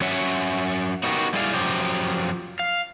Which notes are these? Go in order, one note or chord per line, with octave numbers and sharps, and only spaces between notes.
F#3 C#4 C#5 E5 F#5
B3 D#4 F#4 G4 A#4
G3 E4 G#4 D5 F5
F#2 F3 F#3 G4
F5